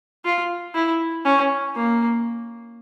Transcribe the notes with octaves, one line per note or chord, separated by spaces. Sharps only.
F4
E4
C#4
A#3